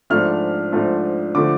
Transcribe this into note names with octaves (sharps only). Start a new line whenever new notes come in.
G#2 F3 A3 D4 F6
G#2 F3 A3 D4
D3 F3 A3 D6